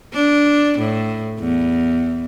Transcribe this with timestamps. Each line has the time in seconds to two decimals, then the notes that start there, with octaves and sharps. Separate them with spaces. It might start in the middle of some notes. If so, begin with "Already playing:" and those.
0.13 D4
0.78 A2
1.39 E2